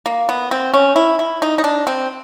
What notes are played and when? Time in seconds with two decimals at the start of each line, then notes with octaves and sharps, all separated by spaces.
0.06 A#3
0.29 B3
0.51 C4
0.74 C#4
0.96 E4
1.19 E4
1.42 D#4
1.58 D#4
1.64 D4
1.87 C4